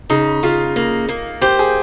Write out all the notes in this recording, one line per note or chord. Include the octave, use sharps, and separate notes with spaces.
C#3 D#4
C#3 F4
A#3
A#3
G4 C5
G#4